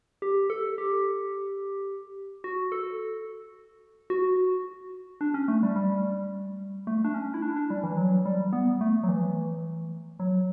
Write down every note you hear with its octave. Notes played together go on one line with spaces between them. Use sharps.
G4
A4
G4
F#4
A4
F#4
D4
C#4
A3
G3
G3
A3
D4
C#4
E4
D4
D4
G3
E3
F#3
G3
B3
A3
F#3
E3
F#3